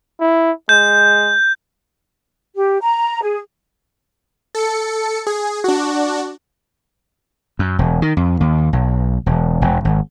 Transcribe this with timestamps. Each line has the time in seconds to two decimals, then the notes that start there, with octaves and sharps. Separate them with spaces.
0.20 E4
0.69 G#3 G6
2.56 G4
2.81 A#5
3.23 G#4
4.55 A4 C#7
5.27 G#4
5.64 D4 F#4
7.59 F#2
7.79 E1
8.02 D#3
8.17 F2
8.40 D#2
8.73 B1
9.26 E1
9.62 E1
9.85 G#1